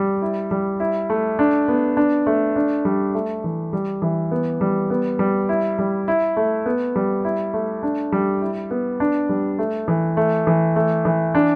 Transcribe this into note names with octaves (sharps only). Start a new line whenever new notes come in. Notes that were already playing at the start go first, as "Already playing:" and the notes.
Already playing: G3
E4
G3
E4
A3
D4
B3
D4
A3
D4
G3
A3
E3
G3
E3
B3
G3
B3
G3
E4
G3
E4
A3
B3
G3
E4
A3
D4
G3
E4
B3
D4
G3
A3
E3
A3
E3
A3
E3
D4